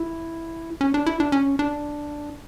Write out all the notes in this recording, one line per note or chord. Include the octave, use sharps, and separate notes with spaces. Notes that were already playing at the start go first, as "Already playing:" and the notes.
Already playing: E4
C#4
D4
E4
D4
C#4
D4